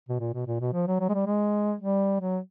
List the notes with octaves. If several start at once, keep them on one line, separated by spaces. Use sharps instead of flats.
B2
A#2
B2
A#2
B2
F3
F#3
F#3
G#3
G3
G#3
G3
F#3